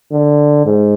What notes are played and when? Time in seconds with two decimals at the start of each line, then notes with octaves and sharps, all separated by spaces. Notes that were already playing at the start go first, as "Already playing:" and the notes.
0.12 D3
0.65 G#2